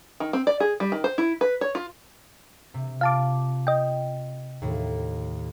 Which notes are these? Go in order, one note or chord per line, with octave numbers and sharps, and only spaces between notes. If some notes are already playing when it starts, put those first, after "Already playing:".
D#3
C4
D5
G#4
G3
D#3
C5
E4
B4
C#5
F4
C3
F4 F5 A5 D6
D#5 G5
D#2 A2